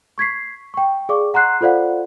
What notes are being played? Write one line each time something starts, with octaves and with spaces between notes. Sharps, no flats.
C#6 G#6 B6 C7
G5 C#6
G#4 D5 F5 C#6 D6
F#5 A#5 C6 F#6 C7
F4 A4 C5 D5 F5 F#5